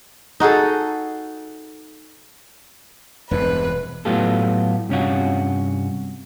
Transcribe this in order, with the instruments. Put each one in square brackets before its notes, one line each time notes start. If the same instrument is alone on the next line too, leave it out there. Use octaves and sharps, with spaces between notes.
[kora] D#4 F#4 G#4 A4
[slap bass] E1 G2 C3 [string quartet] B4
[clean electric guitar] A2 F#3 B3 F4 G4 A4
G2 C3 C#4 D#4 F4 F#4